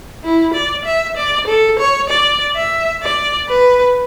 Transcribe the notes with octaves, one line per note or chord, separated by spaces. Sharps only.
E4
D5
E5
D5
A4
C#5
D5
E5
D5
B4